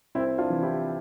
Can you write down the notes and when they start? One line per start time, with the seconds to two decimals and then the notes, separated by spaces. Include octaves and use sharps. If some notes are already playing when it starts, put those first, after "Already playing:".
0.15 C2 C4 E4
0.38 D4 F4
0.50 C3 E3
0.62 E4 G4